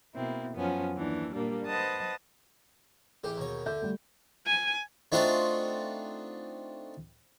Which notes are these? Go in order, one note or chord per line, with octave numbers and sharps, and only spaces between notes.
B2 A#3 C4 E4
F#2 F3 B3 C#4
D#2 E3 D4
A#2 G3 A#3 D4
B4 C5 D#5 F#5 A5 D#6
A1 E3 G4 G#4
D#2 B2 C#5
D3 A4 E5 G6
G3 A3
G#5
A3 C4 D4 D#4 F4 F#4